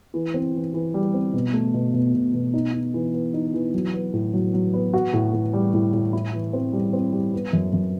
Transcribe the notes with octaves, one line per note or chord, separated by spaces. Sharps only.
E3
C4
E3
E3
G3
C4
B2
A3
B2
B2
B2
B2
D#4
D#4
E3
B3
D#4
E3
F#3
B3
A2
F#3
F#3
B3
F#4
A2
A2
G3
A2
A2
E4
E3
C4
G3
C4
G3
B3
F#2
F#2